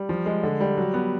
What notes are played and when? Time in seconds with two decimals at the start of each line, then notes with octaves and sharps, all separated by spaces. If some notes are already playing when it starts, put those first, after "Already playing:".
Already playing: G3
0.09 F3
0.26 G#3
0.43 D3
0.60 G3
0.78 F#3
0.94 B3